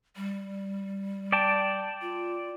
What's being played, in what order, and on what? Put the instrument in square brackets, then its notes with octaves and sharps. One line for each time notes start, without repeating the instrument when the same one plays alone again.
[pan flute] G3
[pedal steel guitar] D5 G5 A5
[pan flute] F4